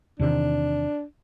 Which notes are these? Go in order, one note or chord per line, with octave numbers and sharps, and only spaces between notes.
E2 C3 D#3 D4